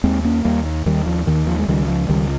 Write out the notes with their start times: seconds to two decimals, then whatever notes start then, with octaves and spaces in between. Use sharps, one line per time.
0.04 D#2 G#3 C4
0.25 A#3 C#4
0.45 D#2 G3 A#3
0.86 D#2 D#3 G3
1.06 F3
1.27 D#2 D#3
1.47 F3
1.59 G#3
1.68 C#2 D#3 G3
1.88 F3
2.09 C#2 D#3 G3